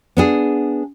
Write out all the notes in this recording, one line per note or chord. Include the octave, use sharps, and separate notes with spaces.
B3 D4 G#4